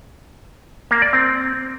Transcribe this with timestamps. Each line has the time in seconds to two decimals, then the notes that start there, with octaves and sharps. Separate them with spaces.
0.91 A#3
1.02 D5
1.13 C4